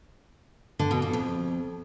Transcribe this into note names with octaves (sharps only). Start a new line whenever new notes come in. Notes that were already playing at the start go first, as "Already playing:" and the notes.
D3
B2
A#2
F2